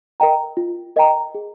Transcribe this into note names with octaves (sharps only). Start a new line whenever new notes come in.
A#4 D#5 G5 A#5
F4
A#4 D#5 G5 A#5
G#4